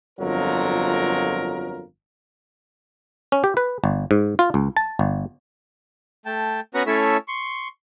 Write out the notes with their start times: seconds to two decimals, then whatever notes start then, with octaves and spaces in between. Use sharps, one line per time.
0.19 G1 F2 F#3 F4 A#4
3.32 C#4
3.44 G4
3.57 B4
3.84 G1
4.11 G#2
4.39 F4
4.54 C#2
4.77 A5
4.99 G1
6.26 A3 G5 A5
6.74 B3 C#4 F#4 B4 F#5 A#5
6.87 A3 C#4 E4 A4 C#5 E5
7.28 C6 C#6